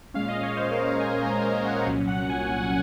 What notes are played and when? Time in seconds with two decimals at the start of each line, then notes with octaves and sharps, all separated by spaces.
0.14 A#2 G#3 C#4 F5
0.29 D#5
0.43 C#5
0.57 C5
0.72 A#4
0.87 C5
1.00 G#5
1.23 A#5
1.44 G#5
1.65 F#5
1.86 C2 A#2 F#3 C#4
2.08 F#5
2.22 F#5
2.30 G#5
2.44 G#5
2.58 F#5